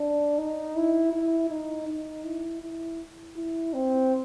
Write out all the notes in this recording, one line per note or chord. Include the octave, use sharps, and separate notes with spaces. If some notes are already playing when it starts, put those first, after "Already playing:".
Already playing: D4
D#4
E4
E4
D#4
D#4
E4
E4
E4
C4